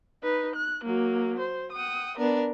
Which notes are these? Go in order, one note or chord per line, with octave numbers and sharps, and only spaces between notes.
D#4 B4
F#6
F#3 A#3
C5
F#5 G5 D#6
B3 D4 A#4